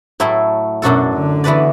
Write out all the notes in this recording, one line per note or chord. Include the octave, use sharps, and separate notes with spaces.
A2 F#3 A3 E4
F#2 B2 F#3 D4 F#4 A4
D3
E3 B3 F#4 B4 D5